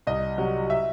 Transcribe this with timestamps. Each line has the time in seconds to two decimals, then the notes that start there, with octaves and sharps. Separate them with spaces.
0.07 C2 D#5
0.38 C3 F#3
0.70 E5